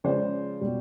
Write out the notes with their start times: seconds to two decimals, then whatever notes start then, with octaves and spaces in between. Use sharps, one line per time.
0.04 C#3 F3 G#3 C5 D5
0.61 B2 G3